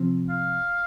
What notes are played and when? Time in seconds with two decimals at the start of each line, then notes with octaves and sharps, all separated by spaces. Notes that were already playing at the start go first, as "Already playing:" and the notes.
Already playing: C3 F3 C4
0.30 F5